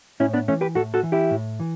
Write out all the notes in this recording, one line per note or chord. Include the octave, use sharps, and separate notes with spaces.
A2 C#4 E4
B3 D4
E3 A3 C#4
G4 B4
A2 F#4 A4
F#4 A4
E3
E4 G4
A2
E3